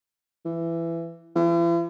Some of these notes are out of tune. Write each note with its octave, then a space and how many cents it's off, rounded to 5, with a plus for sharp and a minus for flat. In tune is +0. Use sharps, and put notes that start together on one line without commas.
E3 +20
E3 +45